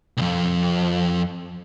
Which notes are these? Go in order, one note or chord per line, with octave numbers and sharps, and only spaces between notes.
C2 F2